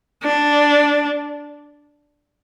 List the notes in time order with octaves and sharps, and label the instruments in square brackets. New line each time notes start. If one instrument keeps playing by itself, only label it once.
[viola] D4